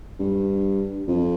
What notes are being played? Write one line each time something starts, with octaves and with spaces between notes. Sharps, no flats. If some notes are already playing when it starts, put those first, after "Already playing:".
G2
F2